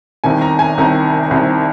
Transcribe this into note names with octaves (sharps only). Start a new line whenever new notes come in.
C2 C3 D#3 G#5
A#5
G#5
C2 C3 D#3 A#5
C2 C3 D#3